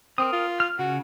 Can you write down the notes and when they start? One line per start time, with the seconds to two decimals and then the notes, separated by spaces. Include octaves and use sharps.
0.18 C4 A#4 D#6
0.33 F4
0.60 F6
0.79 C#3 F#4